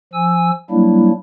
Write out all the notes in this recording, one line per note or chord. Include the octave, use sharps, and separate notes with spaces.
F3 G#5 E6
F#3 G3 A#3 D4 E4